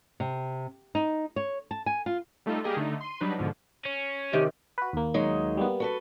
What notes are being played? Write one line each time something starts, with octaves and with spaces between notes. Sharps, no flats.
C3
D#4
C#5
A5
G#5
F4
G3 A3 D#4 F4 A4
G3 A#3 G4 G#4 A#4 D#5
D3 A3 D#4
C6 D#7
F#3 G3 D4 D#4 B4
G#2 B2 D3 F3
C#4
C3 D#3 G4 D#5
F#4 B4
D#2 A#3
F#3 G#3 D#4
G3 A#3 B3
F#4 A4 B4